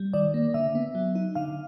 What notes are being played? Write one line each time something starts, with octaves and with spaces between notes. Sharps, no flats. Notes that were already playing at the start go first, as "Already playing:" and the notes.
Already playing: G3
D#3 D5
A#3
D3 E5
B3
F#3
D#4
D3 F5